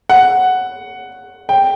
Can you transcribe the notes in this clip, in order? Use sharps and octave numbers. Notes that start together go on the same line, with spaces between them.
F#5
G5